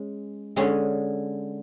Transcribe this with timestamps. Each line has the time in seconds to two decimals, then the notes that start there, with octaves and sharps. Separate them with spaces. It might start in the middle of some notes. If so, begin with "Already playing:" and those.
Already playing: G#3 C#4
0.56 D3 G#3 C#4 G#4